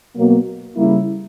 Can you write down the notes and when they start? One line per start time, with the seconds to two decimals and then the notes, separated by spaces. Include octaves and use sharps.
0.15 B2 F#3 A#3
0.76 C#3 G3 A#3 E4